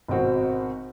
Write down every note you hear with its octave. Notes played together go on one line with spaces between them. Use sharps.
G#1 B2 C4 F#4